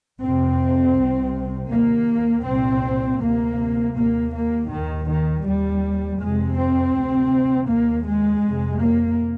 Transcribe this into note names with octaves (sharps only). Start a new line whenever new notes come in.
F2 C3 C4
C2 C3
D#2 A#3
C2 A#2 C4
D2 C3 A#3
D#2 A#3
A#3
D#2 D#3
D#3
D#2 G3
F2 C3 G#3
C4
D2 C3
D#2 A#3
G#3
F2 C3
A#3